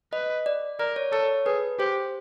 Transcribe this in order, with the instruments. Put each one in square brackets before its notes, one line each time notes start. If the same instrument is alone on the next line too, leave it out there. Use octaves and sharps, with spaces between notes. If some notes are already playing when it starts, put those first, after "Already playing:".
[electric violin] B4 [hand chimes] D#5
[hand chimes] D5
[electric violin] A#4 [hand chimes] D5
[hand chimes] C#5
[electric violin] A4 [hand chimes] C#5
[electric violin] G#4 [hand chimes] B4
[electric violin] G4 [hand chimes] C5